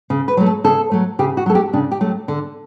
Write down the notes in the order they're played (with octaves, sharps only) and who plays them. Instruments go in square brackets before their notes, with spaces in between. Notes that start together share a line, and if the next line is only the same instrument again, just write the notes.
[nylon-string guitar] C#3
B4
F#3 A3
A4
C#3 A4
F#3 A3
C#3 G4
F#4
F#3 A3 A4
G4
C#3 D4
G4
F#3 A3
D3